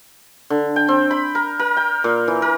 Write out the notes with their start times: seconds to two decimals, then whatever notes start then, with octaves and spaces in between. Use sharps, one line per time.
0.50 D3
0.76 G5
0.88 C4
1.11 B5
1.35 A#4
1.59 A#4
1.77 G5
2.04 A#2
2.28 E3
2.42 A#4